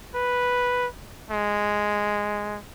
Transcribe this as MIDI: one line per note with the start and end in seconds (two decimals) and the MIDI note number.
0.15 0.87 71
1.31 2.59 56